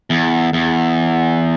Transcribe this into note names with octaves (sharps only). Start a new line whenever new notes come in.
E2
E2